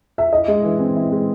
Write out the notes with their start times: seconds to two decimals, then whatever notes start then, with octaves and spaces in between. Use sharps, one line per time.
0.18 E5
0.33 E4 D#5
0.48 G#3
0.64 E3
0.80 C4
0.96 E4
1.12 G#3